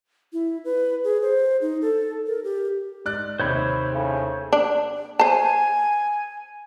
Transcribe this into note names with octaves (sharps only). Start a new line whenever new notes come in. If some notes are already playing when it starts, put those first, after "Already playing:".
E4
B4
G#4
C5
D#4
A4
A#4
G4
G#2 D5 F#6
D#2 C3 D#3 C5 C#5 B5
A2 C#3
D4
C5 G#5 A5